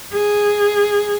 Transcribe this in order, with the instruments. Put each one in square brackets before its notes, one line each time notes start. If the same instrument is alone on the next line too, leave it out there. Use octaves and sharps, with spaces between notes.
[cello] G#4